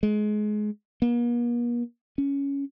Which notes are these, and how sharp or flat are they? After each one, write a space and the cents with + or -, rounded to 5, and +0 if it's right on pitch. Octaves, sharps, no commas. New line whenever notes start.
G#3 +25
A#3 +45
C#4 +10